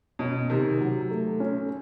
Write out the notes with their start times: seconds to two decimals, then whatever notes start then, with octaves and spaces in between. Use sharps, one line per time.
0.19 B2 C#4
0.50 C3 D#3
0.80 F#3
1.11 A3
1.40 C#4